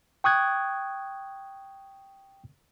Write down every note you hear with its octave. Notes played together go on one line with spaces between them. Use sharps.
G5 C#6 D#6 F#6 G#6